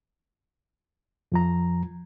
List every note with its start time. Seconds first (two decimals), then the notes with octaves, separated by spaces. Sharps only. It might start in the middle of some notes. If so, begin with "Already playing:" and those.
1.32 F2 F3 A#5